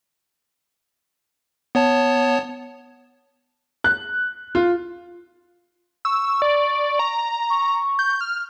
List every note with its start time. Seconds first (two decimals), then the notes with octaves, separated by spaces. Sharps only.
1.75 B3 C#5 A5
3.84 F#6
4.55 F4
6.05 C#6 E6
6.42 D5
6.99 A#5
7.50 C#6
7.99 G6
8.21 F6